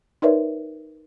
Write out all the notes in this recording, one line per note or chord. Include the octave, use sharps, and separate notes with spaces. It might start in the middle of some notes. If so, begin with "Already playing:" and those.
D#4 A#4 B4 C#5 D5 E5